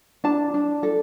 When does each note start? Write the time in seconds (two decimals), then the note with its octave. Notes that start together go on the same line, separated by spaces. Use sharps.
0.24 D4 A5
0.54 D4
0.83 A4